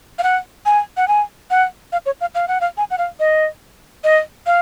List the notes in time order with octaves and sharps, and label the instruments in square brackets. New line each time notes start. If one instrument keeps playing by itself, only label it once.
[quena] F5
F#5
G#5
F#5
G#5
F#5
F5
C#5
F5
F5
F#5
F5
G#5
F#5
F5
D#5
D#5
F5